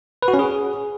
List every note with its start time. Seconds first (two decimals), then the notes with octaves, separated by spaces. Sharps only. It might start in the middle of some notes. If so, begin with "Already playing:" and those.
0.22 B4
0.28 F#4
0.34 C#4
0.39 G#4